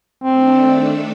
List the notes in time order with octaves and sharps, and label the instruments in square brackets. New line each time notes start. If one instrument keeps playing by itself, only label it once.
[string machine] D#3 A3 D4 A4 [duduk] C4